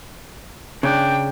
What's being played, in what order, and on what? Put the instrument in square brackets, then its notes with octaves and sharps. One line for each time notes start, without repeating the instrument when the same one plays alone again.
[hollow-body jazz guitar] C#3 [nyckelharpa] D4 G5